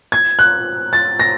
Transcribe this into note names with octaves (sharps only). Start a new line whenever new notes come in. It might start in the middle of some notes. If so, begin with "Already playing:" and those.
G#6
F#6
A6
A#6